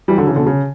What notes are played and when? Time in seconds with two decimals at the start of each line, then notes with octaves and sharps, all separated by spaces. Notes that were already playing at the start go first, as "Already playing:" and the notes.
0.08 E3 G3
0.17 D3 F#3
0.27 C#3 E3
0.36 B2 D3
0.46 C#3